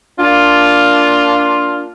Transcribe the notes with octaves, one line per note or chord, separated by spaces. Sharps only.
A#3 D4 F4